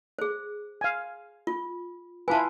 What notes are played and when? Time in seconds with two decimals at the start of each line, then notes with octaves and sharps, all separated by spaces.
0.19 G#4 C5
0.81 F5 G#5
1.47 F4
2.28 E4 F4 B4 G#5 A5